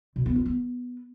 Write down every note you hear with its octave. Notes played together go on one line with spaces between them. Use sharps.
B2
B3
F4
B3